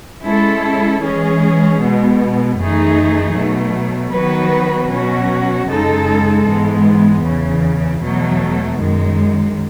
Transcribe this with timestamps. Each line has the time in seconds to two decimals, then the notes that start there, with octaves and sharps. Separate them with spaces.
0.24 G#3 C#4 E4 A4
1.03 E3 G#3 C#4 G#4
1.80 B2 G#3 B3
2.58 F#2 E3 A3 D#4 G#4
3.35 B2 F#3 A3
4.13 D#3 F#3 B3 F#4 B4
4.91 B2 F#3 C#4 F#4
5.68 F#2 C#3 G#3 D#4 A4
6.46 G#2 E3 G#3 B3
7.24 E2 C#3 E3
8.01 E2 B2 F#3 A3
8.78 F#2 D#3 G#3